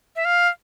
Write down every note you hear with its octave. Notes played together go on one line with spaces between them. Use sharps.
E5
F5